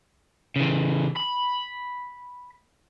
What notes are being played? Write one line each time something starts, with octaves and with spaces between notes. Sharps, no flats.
C#3 E3
B5